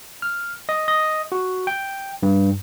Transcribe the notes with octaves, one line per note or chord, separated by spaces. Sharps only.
F6
D#5
D#5
F#4
G5
G2